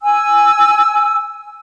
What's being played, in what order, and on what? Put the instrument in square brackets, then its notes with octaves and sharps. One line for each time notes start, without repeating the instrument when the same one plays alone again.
[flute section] G#5 E6